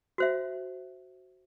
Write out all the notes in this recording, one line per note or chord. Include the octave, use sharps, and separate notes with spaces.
F#4 C5 E5